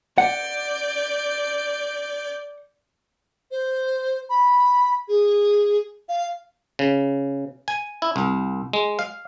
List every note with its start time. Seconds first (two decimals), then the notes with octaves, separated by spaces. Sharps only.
0.18 D5 F#5 G6
3.51 C5
4.30 B5
5.08 G#4
6.09 F5
6.79 C#3
7.68 G#5
8.02 E4
8.16 C2
8.73 G#3
8.99 F5